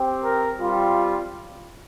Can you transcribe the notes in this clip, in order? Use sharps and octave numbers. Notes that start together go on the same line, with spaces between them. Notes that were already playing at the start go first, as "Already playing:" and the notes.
Already playing: C4 G4
A#4
G3 C4 F4